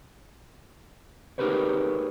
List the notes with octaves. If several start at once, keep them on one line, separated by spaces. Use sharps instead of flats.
D#4 G4 G#4 A#4 B4 C#5